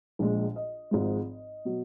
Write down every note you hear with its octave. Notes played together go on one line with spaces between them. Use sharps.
A#1 A#2 G#3
D#5
G#1 G#2 F3 G#3
B2 F#3